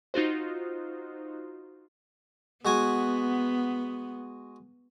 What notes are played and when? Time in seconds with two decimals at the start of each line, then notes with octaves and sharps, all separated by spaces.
0.14 D#4 F4 F#4 C5
2.65 G#3 B3 F#4 G#5